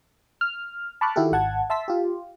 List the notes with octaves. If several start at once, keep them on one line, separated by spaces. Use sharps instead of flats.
F6
A5 B5 C#6 D6 F6 F#6
D#3 E4 F#4 G4 A4
G#1 F#5 A5 G#6
E5 A5 C6 E6 B6
F4 G4